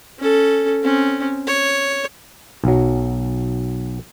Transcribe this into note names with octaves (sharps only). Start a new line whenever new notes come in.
C#4 A4
C4 C#4
C#5
B1 F#3